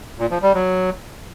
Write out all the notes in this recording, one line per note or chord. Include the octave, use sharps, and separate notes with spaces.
A#2
F3
G3
F#3